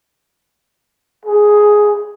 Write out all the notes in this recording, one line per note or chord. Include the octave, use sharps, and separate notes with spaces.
G#4